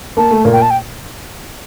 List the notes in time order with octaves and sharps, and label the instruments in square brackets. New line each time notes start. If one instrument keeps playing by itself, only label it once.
[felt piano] A#3 [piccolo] A5
[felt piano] A3
A#2 A#3
[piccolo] G5
A5
G5